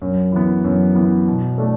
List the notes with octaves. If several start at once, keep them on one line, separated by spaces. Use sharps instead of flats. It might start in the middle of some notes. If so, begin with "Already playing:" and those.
F#2
E3 B3
F#2
E3 B3
B2
A3 D4